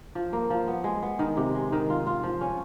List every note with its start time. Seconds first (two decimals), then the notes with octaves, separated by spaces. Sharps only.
0.15 F3
0.33 A#3
0.50 F3
0.68 B3
0.84 G#3
1.03 B3
1.19 D#3
1.37 C3
1.55 G#3
1.72 D#3
1.90 F4
2.07 F4
2.23 F3
2.41 C#4